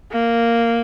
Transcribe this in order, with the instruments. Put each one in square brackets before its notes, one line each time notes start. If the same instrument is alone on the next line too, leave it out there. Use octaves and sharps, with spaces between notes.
[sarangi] A#3